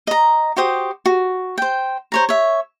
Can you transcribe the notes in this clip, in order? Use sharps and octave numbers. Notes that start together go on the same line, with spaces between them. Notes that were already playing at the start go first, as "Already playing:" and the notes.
D#5 A#5
F#4 G4 C5 D#6
F#4
C5 G5
C5 C#5 A#5
C#5 E5